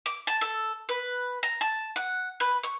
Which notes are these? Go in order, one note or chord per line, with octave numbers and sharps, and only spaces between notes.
D6
A5
A4
B4
A#5
A5
F#5
B4
C#6